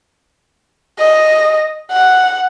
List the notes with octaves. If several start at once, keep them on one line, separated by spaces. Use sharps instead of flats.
D#5
F#5